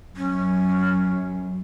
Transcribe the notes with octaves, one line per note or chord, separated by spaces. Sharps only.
F#2 C#4